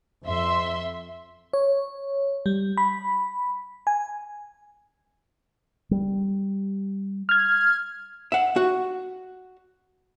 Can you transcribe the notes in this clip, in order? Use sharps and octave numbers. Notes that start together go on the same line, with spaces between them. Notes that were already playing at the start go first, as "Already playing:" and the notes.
F2 E5 C6
C#5
G3
B5
G#5
G3
F6 G#6
E5 F#5
F#4